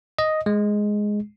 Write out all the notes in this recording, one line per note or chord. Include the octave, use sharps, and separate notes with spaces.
D#5
G#3